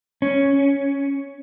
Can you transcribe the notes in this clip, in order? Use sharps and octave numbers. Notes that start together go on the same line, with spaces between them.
C#4